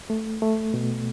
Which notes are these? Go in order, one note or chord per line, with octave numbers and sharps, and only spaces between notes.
A3
A3
B2